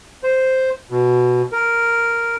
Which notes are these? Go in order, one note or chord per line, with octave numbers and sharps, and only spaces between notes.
C5
B2
A#4